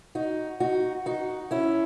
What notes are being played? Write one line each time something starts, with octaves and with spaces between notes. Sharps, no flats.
D#4 F#4
D#4 F#4
D#4 F#4
C#4 E4